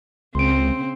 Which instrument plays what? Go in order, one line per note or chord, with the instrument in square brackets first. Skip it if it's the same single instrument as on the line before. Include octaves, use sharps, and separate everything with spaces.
[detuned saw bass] C#2 [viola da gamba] C#3 C4 [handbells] C6 D7